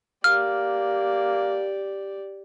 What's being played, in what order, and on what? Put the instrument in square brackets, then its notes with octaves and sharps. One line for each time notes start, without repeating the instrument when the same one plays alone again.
[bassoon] A#3 [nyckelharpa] G4 D5 [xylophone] F6